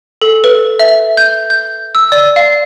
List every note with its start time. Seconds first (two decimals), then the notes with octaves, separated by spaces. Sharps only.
0.22 A4
0.44 B4
0.79 E5
1.17 G6
1.50 G6
1.95 E6
2.12 D5
2.36 F5